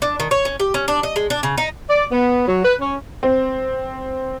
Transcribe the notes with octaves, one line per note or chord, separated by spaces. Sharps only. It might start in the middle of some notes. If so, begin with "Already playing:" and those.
D4
D#3
C#5
C#4
G4
C#4
D4
D#5
G#3
D4
C#3
D#4
D5
B3
F#3
B4
C#4
C4